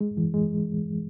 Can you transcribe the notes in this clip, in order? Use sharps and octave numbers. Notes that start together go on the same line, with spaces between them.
G#3
E3
G#3